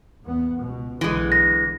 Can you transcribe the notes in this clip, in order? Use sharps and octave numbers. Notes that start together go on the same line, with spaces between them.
E2 B3
C#2 B2
B1 D3 E3 G#3
A#6